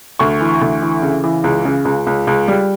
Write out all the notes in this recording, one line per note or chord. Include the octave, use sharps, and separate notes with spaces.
D2 C#6
E3
D2
E3
C#3
E3
C#2
C#3
C#2
C#2
C#2
G3